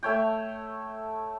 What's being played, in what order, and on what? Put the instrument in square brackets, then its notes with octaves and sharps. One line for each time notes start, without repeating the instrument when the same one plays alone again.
[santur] A3 C#5 G5